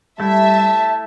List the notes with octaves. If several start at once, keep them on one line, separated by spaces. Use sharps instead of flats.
G3 A3 E4 E5 A5